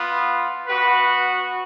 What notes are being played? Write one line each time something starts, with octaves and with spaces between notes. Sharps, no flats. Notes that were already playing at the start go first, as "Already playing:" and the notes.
Already playing: B3 F4
B3 F#4 B4